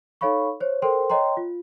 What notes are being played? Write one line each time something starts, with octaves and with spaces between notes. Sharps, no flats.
D#4 A4 C#5 F5 B5 C#6
C5 C#5
A4 A#4 C5 G5 C6
C#5 D#5 G5 A#5 C6
F4